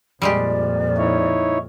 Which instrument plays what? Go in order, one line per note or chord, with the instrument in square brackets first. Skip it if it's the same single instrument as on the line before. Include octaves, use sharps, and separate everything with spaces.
[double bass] F2 A#2 [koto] G3 G#3 G4 [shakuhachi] D5
[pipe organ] D#4 E4 C#5